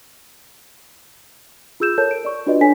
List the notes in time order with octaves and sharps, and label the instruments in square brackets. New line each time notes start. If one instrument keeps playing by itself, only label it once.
[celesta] F4 G#4 E6 G6 E7
A4 A#4 C#5 A5 G6
D7
D5 C#6
D4 F4 F#4 B4 D5 D#5
D4 A4 C#5 G#5 B6